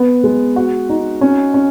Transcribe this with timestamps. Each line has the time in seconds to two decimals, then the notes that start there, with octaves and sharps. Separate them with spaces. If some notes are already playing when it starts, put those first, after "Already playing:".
Already playing: B3
0.24 G#3
0.56 F#4
0.89 D#4
1.21 C#4
1.54 C#4